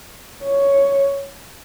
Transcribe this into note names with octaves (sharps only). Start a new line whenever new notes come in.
C#5